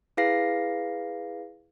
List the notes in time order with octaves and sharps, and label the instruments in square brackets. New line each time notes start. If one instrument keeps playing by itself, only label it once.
[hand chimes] E4 G#4 B4 F5 A#6 C7